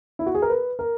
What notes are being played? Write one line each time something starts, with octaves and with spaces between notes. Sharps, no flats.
E4
F#4
G#4
A#4
B4
A#4